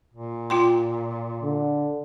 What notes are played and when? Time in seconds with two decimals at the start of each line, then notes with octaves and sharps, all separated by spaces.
0.13 A#2
0.50 F4 G5 C6
1.43 D3